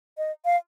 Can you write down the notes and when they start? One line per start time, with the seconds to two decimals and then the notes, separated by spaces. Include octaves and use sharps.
0.18 D#5
0.45 F5